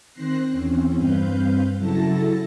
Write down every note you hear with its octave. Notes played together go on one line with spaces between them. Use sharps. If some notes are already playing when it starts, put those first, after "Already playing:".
D#3 C4 C5 F#6 A#6 C7
E2 C4 C#4
G2 C4 B4 F5 G6
C#3 F#3 E4 A4 A5 A#6